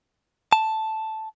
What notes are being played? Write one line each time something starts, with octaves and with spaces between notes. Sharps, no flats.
A5